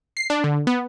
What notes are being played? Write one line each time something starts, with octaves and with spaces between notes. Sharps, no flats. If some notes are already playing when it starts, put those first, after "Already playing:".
C7
D4
D3
B3